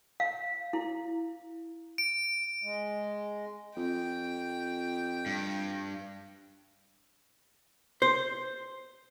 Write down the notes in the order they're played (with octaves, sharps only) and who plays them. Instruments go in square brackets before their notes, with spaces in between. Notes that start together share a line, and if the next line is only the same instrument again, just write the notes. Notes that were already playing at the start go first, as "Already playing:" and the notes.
[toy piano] F5
E4
[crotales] D7
[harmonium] G#3
[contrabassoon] F2 [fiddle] G5
[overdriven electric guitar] G2
[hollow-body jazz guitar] C5